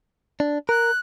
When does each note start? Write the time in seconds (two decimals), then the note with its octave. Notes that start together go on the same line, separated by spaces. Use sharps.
0.40 D4
0.69 A#4 F#6